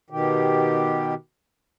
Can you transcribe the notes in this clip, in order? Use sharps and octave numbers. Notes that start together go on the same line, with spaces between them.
B2 D#3 G4